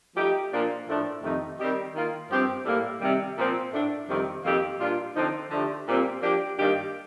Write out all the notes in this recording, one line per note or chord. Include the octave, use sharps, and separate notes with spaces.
F3 A3 D#4 G4
A#2 F3 A#3 D4
A2 F3 A3 D4
F2 C3 D#3 A3 D#4
D#3 G3 C4 D#4 G4
D#3 A#3 F4
G2 F3 C4 G4
A2 G3 A#3
C3 D#3 G3
A#2 F3 C4
A2 A3 D4
F2 C3 D#3 G3 C4
F2 D#3 A#3 D#4 G4
A#2 G3 D4 F4
D3 F3 C4 D#4
D3 F3 A3 D4 G4
A#2 G3 C4
F3 A#3 D4 G4
G2 D#3 A#3 D4 G4